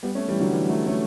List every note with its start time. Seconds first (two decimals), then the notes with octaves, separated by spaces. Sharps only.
0.03 G3 B3
0.15 A3 C#4
0.28 E3 G3
0.40 D3 F#3
0.53 E3 G3
0.69 F#3 A3
0.86 A3 C#4